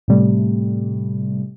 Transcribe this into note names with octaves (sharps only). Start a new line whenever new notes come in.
A2 C3 G3 A3